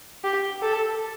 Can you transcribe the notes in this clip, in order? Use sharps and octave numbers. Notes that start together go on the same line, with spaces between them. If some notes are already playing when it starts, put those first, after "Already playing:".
G4
A4